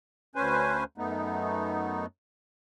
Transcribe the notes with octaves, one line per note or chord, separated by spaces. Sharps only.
D2 C#4 B4 C5 G#5
F#2 A3 B3 D#4